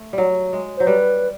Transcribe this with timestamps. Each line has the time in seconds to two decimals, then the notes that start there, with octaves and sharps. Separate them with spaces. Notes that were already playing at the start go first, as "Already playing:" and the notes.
Already playing: A3
0.13 F#3 G3
0.53 G#3
0.77 F#3 C5
0.87 G3 B4